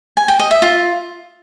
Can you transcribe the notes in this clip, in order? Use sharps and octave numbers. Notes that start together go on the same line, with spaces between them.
G#5
G5
D#5
E5
F4